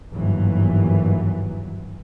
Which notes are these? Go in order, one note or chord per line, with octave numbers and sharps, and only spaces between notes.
G1 D#2 G#2 E3 F#3